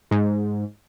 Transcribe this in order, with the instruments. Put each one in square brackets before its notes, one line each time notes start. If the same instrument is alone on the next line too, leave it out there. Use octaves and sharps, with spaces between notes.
[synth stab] G#2